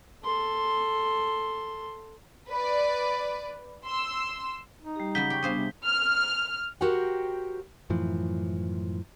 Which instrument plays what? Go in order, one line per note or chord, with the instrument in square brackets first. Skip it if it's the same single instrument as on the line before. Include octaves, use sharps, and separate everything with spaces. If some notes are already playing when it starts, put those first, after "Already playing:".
[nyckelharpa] A4 C6
[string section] B4 D5
C6 E6
[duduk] D#4
[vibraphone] G3 G4
[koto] C#3 F#3 G3 [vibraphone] F#5 [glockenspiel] G6 B6 G7
[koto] G4 [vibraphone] G5 C#6
[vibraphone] G3 B3 D4 [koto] G#4 C5 F5
[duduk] C3
[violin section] F6
[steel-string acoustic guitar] F#4 G4 A#4 C5 F#5 G5
[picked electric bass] F#2 A2 E3 F3